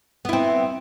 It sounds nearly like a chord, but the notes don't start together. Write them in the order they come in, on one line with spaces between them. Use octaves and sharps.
B3 E4 C4